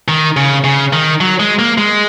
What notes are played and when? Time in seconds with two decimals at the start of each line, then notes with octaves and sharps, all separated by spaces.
0.08 D#3
0.37 C#3
0.64 C#3
0.93 D#3
1.21 F#3
1.40 G#3
1.59 A#3
1.78 G#3